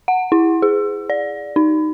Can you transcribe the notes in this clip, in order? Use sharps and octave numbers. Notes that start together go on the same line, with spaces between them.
F#5
E4
G#4
D5
D#4